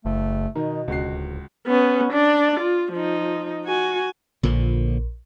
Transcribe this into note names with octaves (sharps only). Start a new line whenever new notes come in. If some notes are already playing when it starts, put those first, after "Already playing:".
F#1 A3
B2 D#3 D#4
D1 C#2 F#4 C7
B3 C#4
D4 D5
F4
F3 D#4
F#4 G#5
A#1 A#2 D3 F3